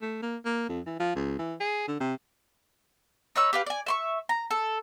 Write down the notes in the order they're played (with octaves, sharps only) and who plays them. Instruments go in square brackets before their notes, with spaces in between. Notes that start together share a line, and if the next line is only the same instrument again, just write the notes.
[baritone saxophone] A3
A#3
A#3
F2
E3
F3
C#2
E3
G#4
D3
C3
[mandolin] D#4 B4 C#5 E6
G4 B4 F5
D5 G#5
E5 C6 C#6
A#5
A4